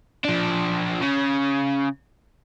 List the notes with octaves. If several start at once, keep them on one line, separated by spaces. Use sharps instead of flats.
F3 D4
C#3